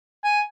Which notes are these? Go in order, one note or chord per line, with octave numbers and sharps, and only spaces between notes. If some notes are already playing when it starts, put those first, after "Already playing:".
G#5